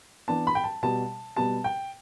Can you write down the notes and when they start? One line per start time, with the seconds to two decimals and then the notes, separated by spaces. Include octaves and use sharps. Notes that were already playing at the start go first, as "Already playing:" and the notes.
0.28 E3 B3 D4 A5
0.47 B5
0.55 G5
0.64 A5
0.83 B2 G3 B3 A5
1.36 B2 G3 B3 A5
1.64 G5